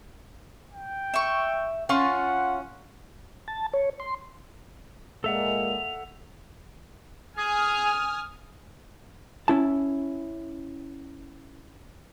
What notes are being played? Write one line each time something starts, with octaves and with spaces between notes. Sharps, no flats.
G5
E5 C#6
C#4 F4 F#5 C6 C#6
A5
C#5
C6
A#2 G#3 A#3 A4 E5 F#5 F7
G#4 G#5 D#6 F6
C#4 E4 A5